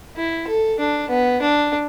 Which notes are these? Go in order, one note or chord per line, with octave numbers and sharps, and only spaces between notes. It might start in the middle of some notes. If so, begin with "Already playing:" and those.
E4
A4
D4
B3
D4